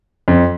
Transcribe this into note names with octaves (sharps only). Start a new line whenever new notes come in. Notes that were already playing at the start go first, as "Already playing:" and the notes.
F2